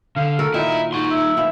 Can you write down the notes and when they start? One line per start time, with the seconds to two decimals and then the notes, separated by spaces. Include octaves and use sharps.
0.16 D3 F5
0.39 F#4 A4 A#4
0.54 A#2 D#3 D#4 E4 A#4
0.93 D#4 F#4 C6
1.11 E5
1.37 F3 B3 E4